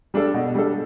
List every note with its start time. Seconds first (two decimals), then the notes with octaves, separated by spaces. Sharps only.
0.14 G3 D4 A4
0.34 B2
0.55 G3 D4 A4